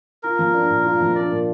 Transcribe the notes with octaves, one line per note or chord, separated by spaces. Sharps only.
F4 A#4
F3
D4
A#2
F4
F3
D4 D5
A#2